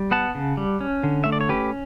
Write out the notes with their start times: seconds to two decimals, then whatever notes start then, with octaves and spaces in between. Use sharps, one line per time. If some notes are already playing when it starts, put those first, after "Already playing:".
Already playing: G3
0.11 B3 F#5 A5
0.35 C#3
0.57 G3
0.81 C#4
1.03 D3
1.24 A3 E5
1.32 D5
1.41 C#5
1.49 C#4 G4 B4